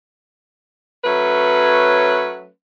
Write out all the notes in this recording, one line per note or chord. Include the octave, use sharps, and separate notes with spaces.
F#3 A3 C#4 B4